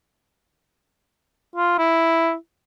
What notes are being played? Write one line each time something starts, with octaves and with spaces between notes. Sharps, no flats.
F4
E4